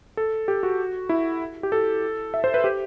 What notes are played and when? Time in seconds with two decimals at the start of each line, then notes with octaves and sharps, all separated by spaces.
0.17 A4
0.48 G4
0.63 F#4
1.09 E4
1.63 G4
1.72 A4
2.34 E5
2.44 C5
2.54 B4
2.64 G4